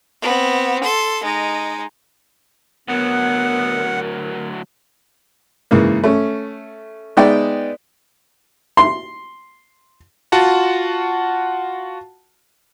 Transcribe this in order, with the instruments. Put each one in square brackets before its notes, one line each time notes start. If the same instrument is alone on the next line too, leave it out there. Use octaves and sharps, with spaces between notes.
[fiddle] B3 C4
A4 C6
G#3 D#4
[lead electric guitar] D2 F#3 [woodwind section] B3 [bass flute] A#4 [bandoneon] F#5
[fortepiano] G#2 C#3 E3 A#3
A3 C#4
G#3 B3 D#4 D5 E5 G5
C6
[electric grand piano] F4 F#4 F#5 A5